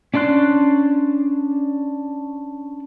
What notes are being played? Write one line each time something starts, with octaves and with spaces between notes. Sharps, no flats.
C#4 D4 D5 C6 F#6